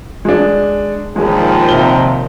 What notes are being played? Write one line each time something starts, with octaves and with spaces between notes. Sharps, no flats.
G#3 D4
D#2 A#2 F3 G#3
C3 G7